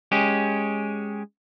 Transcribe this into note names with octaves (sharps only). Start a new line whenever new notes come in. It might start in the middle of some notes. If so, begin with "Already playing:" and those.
G#3 C#4 G4